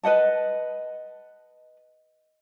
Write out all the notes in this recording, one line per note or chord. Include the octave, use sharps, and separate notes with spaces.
B4 D#5 F#5 A5